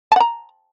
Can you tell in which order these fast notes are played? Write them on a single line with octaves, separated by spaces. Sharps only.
A5 F#5 A#5